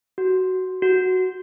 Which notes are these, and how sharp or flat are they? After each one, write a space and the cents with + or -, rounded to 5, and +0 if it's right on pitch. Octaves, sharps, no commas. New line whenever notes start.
F#4 +10
F#4 +0